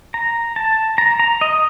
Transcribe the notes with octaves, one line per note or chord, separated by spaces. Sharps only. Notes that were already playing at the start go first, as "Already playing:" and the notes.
A#5
A5
A#5
A#5
D#5